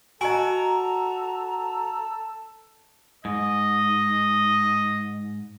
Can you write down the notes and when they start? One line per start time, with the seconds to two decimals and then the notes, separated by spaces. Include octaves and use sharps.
0.21 F#4 A4 D#5 G#5 A#5
3.25 G#2 D#5